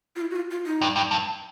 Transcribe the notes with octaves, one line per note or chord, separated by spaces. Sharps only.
F4
E4
F#4
F4
F4
D#4
G2
G2
G2